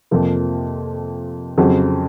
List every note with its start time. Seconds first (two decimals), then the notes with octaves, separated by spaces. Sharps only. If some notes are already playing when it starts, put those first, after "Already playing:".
0.11 F2 C3 F3 A#3
1.58 F2 C#3 F#3 C4 F#4